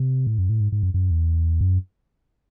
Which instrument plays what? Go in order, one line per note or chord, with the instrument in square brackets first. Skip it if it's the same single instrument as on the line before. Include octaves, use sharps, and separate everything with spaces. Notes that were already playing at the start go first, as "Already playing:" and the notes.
Already playing: [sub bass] C3
A2
F#2
A2
G#2
G#2
F#2
F#2
E2
F#2